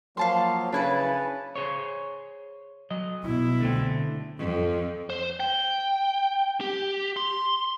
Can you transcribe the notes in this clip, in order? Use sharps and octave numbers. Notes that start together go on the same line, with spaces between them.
F3 F#3 A#3 F5 A5 C6
C#3 D4 E4 B4 A5
G#4 C5 C#5
F#3 D#5
B2 E4
D3 A3 C4
F2
C5
G5
G4
C6